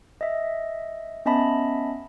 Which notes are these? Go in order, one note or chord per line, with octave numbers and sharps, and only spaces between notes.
D#5 E5
B3 C#4 D#5 E5 A5 B5